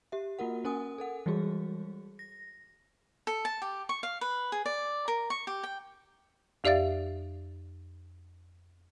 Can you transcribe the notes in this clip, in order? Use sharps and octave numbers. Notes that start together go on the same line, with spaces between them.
G4 E5
A#3 F4 F#4 A#4 F#5
C#4 A#4 G#5 D#6
A4 A#4 F#5
E3 G3 G#3 F#4 G#4
A#6
A4
A5
G4
C#6
F5
B4
G#4
D5
A#4
C#6
G4
G5
F2 G4 D5 E5 F5 A6